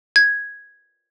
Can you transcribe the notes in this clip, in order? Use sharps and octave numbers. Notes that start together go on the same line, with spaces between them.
G#6